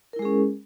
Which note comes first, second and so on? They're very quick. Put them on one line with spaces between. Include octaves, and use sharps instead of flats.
A#4 E4 G#3 G#4 C#4